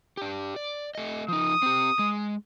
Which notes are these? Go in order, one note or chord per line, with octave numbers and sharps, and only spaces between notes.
D4 G4
D5
A3 D#5
F3 D#4 D#6
C4 G4
G#3